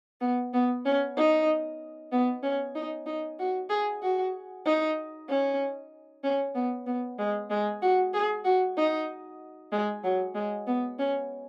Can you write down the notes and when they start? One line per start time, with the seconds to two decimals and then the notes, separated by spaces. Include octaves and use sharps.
0.21 B3
0.53 B3
0.85 C#4
1.17 D#4
2.12 B3
2.43 C#4
2.75 D#4
3.06 D#4
3.39 F#4
3.69 G#4
4.02 F#4
4.66 D#4
5.29 C#4
6.23 C#4
6.54 B3
6.86 B3
7.19 G#3
7.50 G#3
7.82 F#4
8.14 G#4
8.45 F#4
8.77 D#4
9.72 G#3
10.03 F#3
10.35 G#3
10.67 B3
10.99 C#4